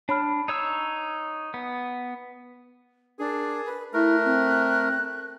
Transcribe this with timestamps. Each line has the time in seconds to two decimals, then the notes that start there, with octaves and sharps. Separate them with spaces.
0.09 D4 C#5 B5 F6
0.48 D#4 C#5 D#6 E6
1.54 B3
3.19 D4 G#4 A#4
3.66 B4
3.93 A3 E4 A#4 F#6
4.23 C4